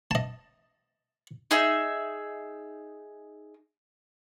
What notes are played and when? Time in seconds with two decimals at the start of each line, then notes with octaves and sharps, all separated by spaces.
0.11 D#5 A5
1.51 D#4 G#4 E5